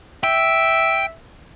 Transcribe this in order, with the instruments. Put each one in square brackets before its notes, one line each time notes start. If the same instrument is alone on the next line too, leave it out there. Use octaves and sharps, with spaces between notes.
[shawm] E5 [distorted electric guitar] G5